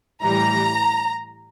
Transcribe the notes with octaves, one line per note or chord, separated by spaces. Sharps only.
A2 E3 G3 A#5